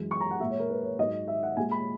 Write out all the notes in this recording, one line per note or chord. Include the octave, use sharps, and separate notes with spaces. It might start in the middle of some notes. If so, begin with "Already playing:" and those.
Already playing: F#2 E3 G#3
C#6
A#5
F#5
A#2 G#3 E5
C#5
A#4
B4
C#5
G#2 F#3 D#5
E5
F#5
A#2 G#3 G#5
B5